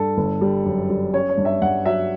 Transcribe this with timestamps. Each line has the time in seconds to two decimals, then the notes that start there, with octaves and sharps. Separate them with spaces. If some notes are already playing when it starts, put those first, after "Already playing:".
Already playing: G2 A4
0.17 G1
0.41 G3
0.65 F#2
0.90 G3
1.13 C#4 C#5
1.29 C#5
1.37 G2
1.45 E5
1.62 G2 F#5
1.86 F#3 E5